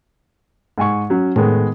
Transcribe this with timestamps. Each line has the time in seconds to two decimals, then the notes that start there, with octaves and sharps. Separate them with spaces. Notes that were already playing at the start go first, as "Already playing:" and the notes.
0.78 G#2 G#5 C#6
1.10 F#3 C#4
1.36 A2 D#3 G#3 B3